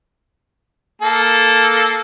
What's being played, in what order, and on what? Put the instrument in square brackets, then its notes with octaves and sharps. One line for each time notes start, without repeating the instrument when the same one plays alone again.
[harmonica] A#3 A4